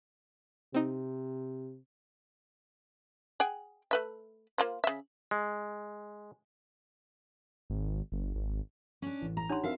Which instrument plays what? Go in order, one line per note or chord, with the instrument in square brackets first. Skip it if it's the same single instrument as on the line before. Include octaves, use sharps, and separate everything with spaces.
[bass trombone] C3 [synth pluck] C4 D#4
[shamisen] G#4 F#5 G5
A3 B4 E5
A#3 F4 C5
C#3 E5
[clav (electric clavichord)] G#3
[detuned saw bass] G#1
G1
G#1
[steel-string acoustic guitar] C#4 D4
[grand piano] A1
[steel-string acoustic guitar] A#5
[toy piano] D4 D#4 C6 [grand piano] G4 C#5 F#5
[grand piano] C4 D4 A#4 [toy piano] F#4 [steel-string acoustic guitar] E5 F5